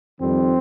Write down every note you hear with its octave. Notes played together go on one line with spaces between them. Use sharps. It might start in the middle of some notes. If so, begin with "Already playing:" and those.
F2 D#3 G3 C4